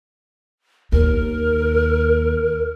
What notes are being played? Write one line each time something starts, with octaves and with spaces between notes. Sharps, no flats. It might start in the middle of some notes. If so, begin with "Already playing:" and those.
D#2 A#4